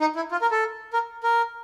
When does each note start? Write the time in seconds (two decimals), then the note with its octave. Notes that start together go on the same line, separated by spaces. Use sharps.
0.01 D#4
0.16 E4
0.31 F4
0.42 A#4
0.51 A4
0.93 A#4
1.23 A#4